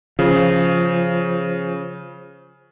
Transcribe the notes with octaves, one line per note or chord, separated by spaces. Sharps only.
C#3 F3